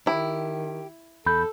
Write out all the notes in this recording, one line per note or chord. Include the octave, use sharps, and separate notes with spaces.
D#3 E4 G4
E2 A4 B5 G6